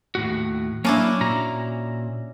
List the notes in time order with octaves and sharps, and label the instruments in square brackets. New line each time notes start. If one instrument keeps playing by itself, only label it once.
[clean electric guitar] D#2 A2 F#4
[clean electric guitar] F#3 A#3 [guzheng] C#4 D4 E4
[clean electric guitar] A#2 F#4 A#5